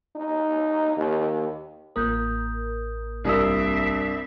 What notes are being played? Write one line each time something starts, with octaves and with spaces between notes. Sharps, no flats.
D#4
D#2
A1 A#3 A#4 D#6 G6
C2 G2 C4 D4 E5 D#6 E6 B6